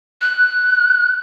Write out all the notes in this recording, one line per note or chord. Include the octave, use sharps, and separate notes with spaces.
F#6